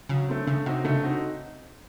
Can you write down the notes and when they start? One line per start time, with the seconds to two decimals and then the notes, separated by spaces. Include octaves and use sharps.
0.09 C#3 F#3
0.29 A3 C4
0.47 C#3 A3
0.66 C3 C4 D#4 F#4
0.85 C#3 A3
1.04 C4 D#4 F#4